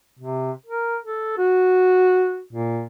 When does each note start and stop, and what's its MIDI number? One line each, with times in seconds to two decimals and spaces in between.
0.19 0.51 48
0.66 0.97 70
1.04 1.36 69
1.37 2.41 66
2.52 2.85 46